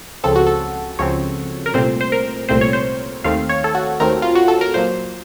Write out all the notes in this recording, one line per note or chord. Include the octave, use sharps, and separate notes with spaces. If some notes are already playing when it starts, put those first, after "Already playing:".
C#2 C#3 F3 C4 A4
F#4
A4
C#2 C#3 F3 C4 C#5
A#4
C2 A#2 A3 C4 C5
C5
A#4
C2 A#2 A3 C4 C5
C#5
C5
D#2 D#3 A3 C4 F5
C#5
A4
F#4
D#2 D#3 A3 C4 A#4
F4
F#4
A4
A#4
A#2 F#3 A#3 C5